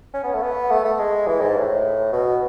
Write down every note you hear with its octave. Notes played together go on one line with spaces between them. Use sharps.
C#4
B3
A3
B3
A3
A3
G#3
E3
G#2
A2
B2